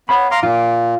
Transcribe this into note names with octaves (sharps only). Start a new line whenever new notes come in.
B3 C#5 F5 B5
F5 A#5 C6 D6
A#2 F4